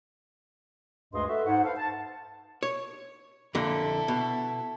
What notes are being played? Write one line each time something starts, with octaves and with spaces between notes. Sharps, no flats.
D2 G2 G#3 G#4 D#5 C6
F#4 A4 B4 E5
G#2 C5 F#5
A4 B4 C5 F5
A5
C#5
F2 A#2 D3 E4 A4
B2